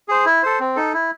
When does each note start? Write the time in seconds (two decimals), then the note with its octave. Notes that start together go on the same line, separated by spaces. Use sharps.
0.08 G#4 C5
0.25 E4
0.43 A4 C5
0.60 C4
0.76 D#4 A4
0.94 E4